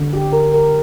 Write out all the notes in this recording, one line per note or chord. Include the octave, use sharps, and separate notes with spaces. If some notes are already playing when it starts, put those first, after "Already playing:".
Already playing: D3
G4
A#4
A#4